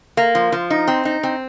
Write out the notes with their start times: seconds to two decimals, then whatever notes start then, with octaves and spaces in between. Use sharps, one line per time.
0.17 A#3
0.35 F3
0.52 F3
0.70 D#4
0.88 C4
1.05 D#4
1.23 C4